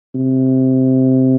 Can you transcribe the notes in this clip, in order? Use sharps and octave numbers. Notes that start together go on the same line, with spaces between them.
C3